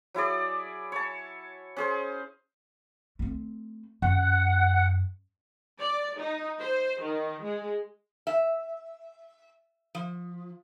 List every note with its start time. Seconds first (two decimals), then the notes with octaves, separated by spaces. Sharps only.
0.14 F#3 E4 G#4 D5
0.92 C#5 A5
1.77 C#4 G#4 C5
3.19 A3 C4
4.02 F#2 F#5
5.80 D5
6.19 D#4
6.59 C5
7.01 D#3
7.43 G#3
8.27 E5
9.95 F3